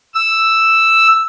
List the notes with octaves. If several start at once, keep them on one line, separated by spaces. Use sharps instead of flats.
E6